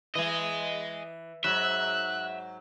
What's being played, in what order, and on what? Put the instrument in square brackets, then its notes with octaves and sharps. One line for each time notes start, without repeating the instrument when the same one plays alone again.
[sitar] E3 [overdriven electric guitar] D#5 G#5
[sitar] G#2 F#3 [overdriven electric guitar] E5 [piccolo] F#6